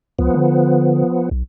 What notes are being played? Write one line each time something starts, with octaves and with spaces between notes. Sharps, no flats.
C#2 F3 B3
D3
B1